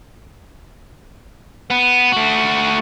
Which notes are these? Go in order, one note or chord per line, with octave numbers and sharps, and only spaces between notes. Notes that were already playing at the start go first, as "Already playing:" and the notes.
B3
A3 F#4